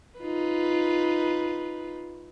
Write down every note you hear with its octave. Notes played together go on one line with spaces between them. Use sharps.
D#4 F4 B4